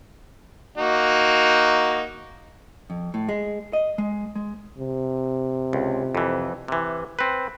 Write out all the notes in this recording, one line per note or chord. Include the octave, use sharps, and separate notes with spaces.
A#3 D#4 F#4
F2
A2
G#3
D#5
G#3
G#3
C3
C#2
F2 E3
C3 E3
C4 B4